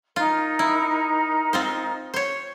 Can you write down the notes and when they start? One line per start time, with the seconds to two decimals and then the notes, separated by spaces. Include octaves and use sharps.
0.16 D#4 F4 A#4
0.59 E4
1.53 C4 F4 C5
2.14 C5 C#5